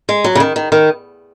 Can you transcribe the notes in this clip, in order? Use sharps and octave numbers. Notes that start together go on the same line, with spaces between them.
G#3
F#3
C#3
D#3
D#3
D#3